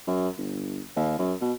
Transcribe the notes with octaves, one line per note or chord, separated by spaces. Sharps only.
F#2
G1
D#2
F#2
B2